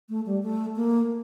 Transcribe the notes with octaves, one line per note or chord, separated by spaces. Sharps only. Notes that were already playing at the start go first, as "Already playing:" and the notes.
A3
G3
A3
A#3